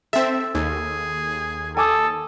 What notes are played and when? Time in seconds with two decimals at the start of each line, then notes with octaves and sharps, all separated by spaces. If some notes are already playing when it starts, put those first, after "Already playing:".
0.13 C4 A4 E5 E6
0.55 D#2 G#4
1.77 A4 G#5 D6 D#6